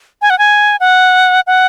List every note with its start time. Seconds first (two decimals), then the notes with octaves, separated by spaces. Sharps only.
0.22 G#5
0.30 F#5
0.39 G#5
0.80 F#5
1.47 F#5